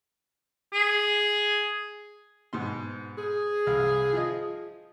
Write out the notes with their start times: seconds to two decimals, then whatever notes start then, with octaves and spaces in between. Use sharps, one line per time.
0.73 G#4
2.53 G#2 B2 C6
3.18 G#4
3.67 C2 F5
4.13 F3 F4 D#5